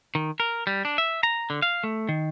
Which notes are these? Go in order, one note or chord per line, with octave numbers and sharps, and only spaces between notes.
D#3
A#4
G3
D4
E5
A#5
D3
F5
A3
D#3